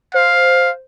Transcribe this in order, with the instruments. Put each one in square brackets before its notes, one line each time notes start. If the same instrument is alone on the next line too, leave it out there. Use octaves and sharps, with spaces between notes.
[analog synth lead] C5 [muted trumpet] F5